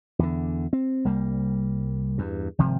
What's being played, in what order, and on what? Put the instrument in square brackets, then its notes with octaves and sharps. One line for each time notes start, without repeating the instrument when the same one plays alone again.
[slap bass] E2 D3
C4
C2 G3 A#3
E2 G2
G#1 C3 F3